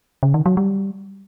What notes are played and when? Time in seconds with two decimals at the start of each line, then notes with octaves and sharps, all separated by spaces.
0.23 C#3
0.34 D#3
0.46 F#3
0.57 G3